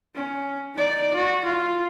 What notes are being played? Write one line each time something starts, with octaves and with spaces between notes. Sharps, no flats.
C#4
D#4 D5
F#4
F4